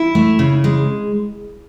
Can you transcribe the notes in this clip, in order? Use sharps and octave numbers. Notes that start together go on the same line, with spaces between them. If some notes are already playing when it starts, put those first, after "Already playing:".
Already playing: E4
A3
C#3
G#3